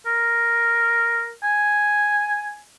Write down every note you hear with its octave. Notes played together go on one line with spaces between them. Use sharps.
A#4
G#5